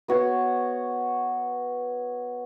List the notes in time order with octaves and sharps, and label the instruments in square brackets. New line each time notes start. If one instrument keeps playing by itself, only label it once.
[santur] B3 F#4 C#5